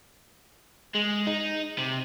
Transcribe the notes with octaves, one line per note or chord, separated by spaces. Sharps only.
G#3
D#4
C3